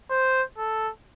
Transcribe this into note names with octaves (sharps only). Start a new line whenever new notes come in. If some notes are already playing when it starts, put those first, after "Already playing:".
C5
A4